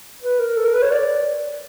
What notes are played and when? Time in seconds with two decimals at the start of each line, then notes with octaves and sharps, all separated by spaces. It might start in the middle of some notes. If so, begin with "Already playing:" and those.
0.22 B4
0.39 A#4
0.57 A4
0.65 A#4
0.74 B4
0.82 C#5
0.90 D5